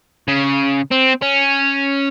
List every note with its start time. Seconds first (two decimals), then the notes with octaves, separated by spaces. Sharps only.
0.28 C#3
0.92 C4
1.22 C#4